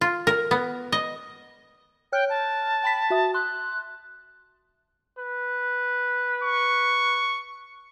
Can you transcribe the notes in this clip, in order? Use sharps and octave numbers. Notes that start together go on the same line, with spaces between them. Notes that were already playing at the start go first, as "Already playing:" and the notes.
F4
A#4
B3
D#5
C#5 G5 F6 F#6
A5
G5 B5 B6
F#4 E5 D#6
C6 F#6
B4
C#6